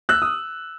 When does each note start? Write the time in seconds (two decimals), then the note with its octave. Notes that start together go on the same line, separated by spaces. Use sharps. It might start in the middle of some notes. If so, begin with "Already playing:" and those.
0.09 E6 F#6
0.22 D#6